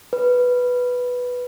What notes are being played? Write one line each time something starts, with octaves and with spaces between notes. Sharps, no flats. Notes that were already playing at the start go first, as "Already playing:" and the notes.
B4